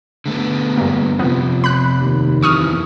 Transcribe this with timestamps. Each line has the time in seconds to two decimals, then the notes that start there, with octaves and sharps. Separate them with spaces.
0.26 D3 A3 B3
0.78 G2 A#3
1.19 F2 C3 F3 B3
1.64 B5 F#6
2.01 D#2
2.43 F2 E3 C#6 D#6 F6